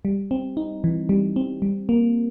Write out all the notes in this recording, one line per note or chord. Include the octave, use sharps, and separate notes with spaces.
G3
C4
D#4
E3
G3
C4
G3
A#3